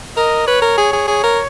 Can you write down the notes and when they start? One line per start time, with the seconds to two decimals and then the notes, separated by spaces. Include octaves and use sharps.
0.17 A#4 D#5
0.47 B4 C#5
0.62 A#4
0.78 G#4
0.93 G#4
1.08 G#4 C#5
1.24 A#4